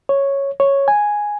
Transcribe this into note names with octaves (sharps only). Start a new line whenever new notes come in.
C#5
C#5
G#5